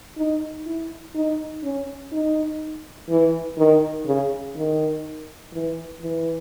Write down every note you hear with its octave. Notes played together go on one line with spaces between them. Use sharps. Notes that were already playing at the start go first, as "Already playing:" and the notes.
D#4
E4
D#4
C#4
D#4
E3
D#3
C#3
D#3
E3
E3